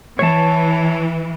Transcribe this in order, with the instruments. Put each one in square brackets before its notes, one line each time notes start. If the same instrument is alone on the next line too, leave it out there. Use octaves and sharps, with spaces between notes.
[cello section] E3 [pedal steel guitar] C#5 A5